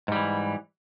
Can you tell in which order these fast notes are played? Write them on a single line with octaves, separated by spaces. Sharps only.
G#2 G3 E3